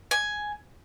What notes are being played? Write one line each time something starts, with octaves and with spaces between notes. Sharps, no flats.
G#5